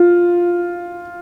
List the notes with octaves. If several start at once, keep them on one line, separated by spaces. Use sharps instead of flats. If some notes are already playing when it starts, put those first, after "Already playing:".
Already playing: F4